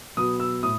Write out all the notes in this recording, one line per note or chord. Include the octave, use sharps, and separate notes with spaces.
B2 F#3 B3 D#6
E6
A2 D#6